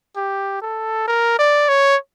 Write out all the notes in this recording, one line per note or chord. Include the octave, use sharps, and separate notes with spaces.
G4
A4
A#4
D5
C#5